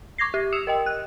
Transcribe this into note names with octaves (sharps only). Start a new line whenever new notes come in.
C#6 D6 G#6 A#6 C7
G4
D#6 E6 C#7 E7 F7
A#4 D#5 G5
F#6